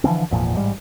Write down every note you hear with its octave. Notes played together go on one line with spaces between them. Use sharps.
D3 E3 F3 C4
G#1 E2 A#2 F3
A1 G#2 F3 G3